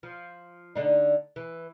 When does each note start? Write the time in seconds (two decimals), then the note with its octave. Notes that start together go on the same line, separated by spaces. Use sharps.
0.03 F3
0.75 D3 D4 D#4
1.36 E3